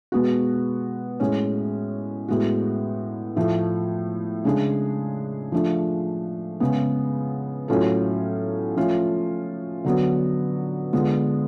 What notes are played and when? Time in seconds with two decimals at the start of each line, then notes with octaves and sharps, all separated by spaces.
0.12 B2 G#3 B3 F#4
1.20 A2 G#3 C#4
2.28 A2 G#3 B3 F#4
3.36 A2 F3 A3
4.45 C#3 G#3 D4 G#4
5.52 F3 A3 D4
6.60 C#3 G#3 B3
7.68 A2 F#3 C#4 F4 A4
8.77 F3 A3 C#4 F4
9.85 D3 F#3 B3
10.93 D3 G#3 B3 F4